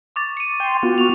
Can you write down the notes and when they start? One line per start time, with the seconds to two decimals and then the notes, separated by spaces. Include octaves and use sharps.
0.16 C#6 D6 A6
0.37 C#7 D#7
0.60 G5 C6
0.83 B3 F4 F#4
0.98 C#6 F7